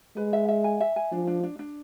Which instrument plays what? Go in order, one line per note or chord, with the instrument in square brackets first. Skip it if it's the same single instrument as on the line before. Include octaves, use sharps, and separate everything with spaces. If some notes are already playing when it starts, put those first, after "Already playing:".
[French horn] G#3 [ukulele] B4
[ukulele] E5
E5
G#5
E5
G#5
[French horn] F3 [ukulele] D4
[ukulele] D4
D4
D4